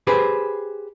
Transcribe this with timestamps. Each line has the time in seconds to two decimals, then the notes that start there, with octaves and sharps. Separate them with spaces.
0.07 G4 G#4 B4 C5